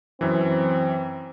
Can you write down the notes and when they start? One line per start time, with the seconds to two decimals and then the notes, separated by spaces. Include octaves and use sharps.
0.21 F#2 E3 C4